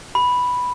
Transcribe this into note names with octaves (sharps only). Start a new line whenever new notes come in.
B5